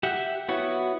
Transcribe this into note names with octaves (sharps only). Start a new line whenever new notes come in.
G4 E5 F#5
B3 E4 F#4 C#5